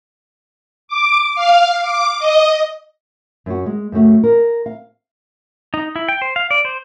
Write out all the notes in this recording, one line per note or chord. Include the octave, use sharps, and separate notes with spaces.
D6
F5
D6
D#5
F#2 F#4
G#3
F#2 C#3 A3 F#4
A#4
F5
D#4
E4
G5
C5
F5
D5
C5